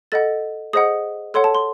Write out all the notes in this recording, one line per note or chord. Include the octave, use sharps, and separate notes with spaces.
A4 D#5 F#5 A6
G#4 C5 D#5 F#5 D#6
A4 C#5 F#5 C6
A5
C6